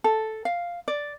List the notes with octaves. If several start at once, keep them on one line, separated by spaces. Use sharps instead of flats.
A4
F5
D5